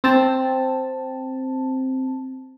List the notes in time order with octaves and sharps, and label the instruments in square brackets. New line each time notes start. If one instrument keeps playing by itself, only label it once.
[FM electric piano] C4 A5